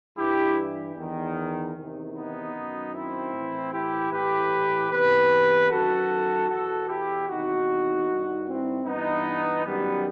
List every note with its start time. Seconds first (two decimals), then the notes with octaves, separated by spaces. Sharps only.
0.17 G2 E3 E4 G4
0.96 E2 D#3
1.75 E2 C3 D#3
2.14 B3 D#4
2.54 F#2 D#3
2.94 C4 E4
3.33 A2 E3
3.72 E4 G4
4.12 A2 E3 G4 B4
4.91 E2 C3 E3 G4 B4
5.70 F#2 D#3 F#4 A4
6.49 E2 B2 F#4 A4
6.88 E4 G4
7.28 E2 C3 D#3 D#4 F#4
8.07 G2 D#3
8.46 C4 E4
8.86 G2 E3 B3 D#4
9.64 F#2 D#3 G3 B3